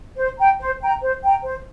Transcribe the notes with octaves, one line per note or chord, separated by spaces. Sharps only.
C5
G5 A#5
C5
G5 A#5
C5
G5 A#5
C5